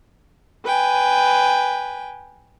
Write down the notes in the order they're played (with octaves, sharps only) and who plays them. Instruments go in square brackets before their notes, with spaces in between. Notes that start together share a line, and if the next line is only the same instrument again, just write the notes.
[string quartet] B4 G5 G#5